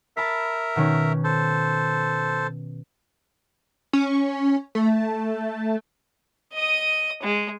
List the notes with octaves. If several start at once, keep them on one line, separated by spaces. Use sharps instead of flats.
A#4 E5 A5 B5 B6
B2 D#3 C#4
A4 C5
C#4
A3
D#5 D#6
G#3